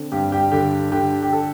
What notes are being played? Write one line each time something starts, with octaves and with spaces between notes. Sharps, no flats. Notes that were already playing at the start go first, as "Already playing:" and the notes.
Already playing: D3 C4
G2 G4
G4
D3 G4
D3 G4
G4
A4